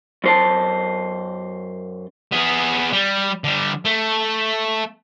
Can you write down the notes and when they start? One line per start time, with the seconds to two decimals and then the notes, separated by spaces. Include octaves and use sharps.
0.24 F#2 C5 A5
2.32 B3 G#4
2.93 G3
3.44 D3 G3
3.85 A3